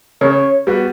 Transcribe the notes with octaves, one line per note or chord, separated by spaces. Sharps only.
C#3 C#5
G3 B3 F#4